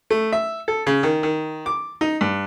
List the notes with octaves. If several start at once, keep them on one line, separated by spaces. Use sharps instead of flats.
A3
E5
A4
C#3
D#3
D#3
D6
D#4
G2